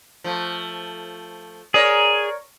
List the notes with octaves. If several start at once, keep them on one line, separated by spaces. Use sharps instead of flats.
F3 A3
G#4 A#4 C#5 D5